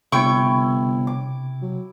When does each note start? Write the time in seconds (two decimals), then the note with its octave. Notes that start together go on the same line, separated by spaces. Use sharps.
0.12 G1 C3 E4 C#5 G5 C#6
1.07 D6
1.62 F#3